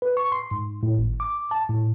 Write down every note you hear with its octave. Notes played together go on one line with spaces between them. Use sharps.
B4
C#6
C6
G#2
A2
G#1
D6
A5
A2